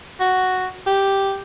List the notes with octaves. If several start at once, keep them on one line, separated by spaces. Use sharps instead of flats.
F#4
G4